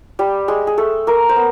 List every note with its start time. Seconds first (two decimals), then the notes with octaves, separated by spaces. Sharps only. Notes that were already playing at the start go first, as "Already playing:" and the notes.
0.19 G3 G4
0.48 G#3 G#4
0.67 G#4
0.78 A3 A4
1.07 A#3 A#4
1.29 C5
1.36 B3